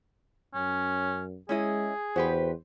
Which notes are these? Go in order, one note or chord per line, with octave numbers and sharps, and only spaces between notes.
F#2 C#4
G#3 C#4 E4 G#4 D#5
E2 F#4 G4 B4 C5